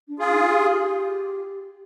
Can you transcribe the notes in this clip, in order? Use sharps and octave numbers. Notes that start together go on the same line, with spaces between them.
D4
F4 G#4
D#4
G4